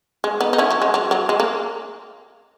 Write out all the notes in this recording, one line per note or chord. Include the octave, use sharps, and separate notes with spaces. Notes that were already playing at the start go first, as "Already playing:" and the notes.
G#3
B3 D#4
D#4
C#4 E4
F#3
G#3
F#3
F#3
G#3
A#3